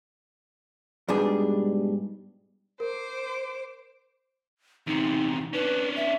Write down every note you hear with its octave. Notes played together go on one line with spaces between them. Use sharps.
G#2 B2 G3 B3 D4 G#4
A#4 C5 D6
E2 C3 D#4
C#4 D4 B4
E5